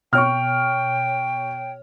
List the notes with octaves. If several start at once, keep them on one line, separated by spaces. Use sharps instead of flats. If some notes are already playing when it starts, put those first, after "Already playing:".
B2 C#5 G5 C#6 F6